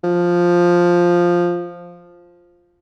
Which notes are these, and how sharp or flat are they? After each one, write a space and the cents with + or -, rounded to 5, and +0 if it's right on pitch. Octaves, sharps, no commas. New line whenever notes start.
F3 +5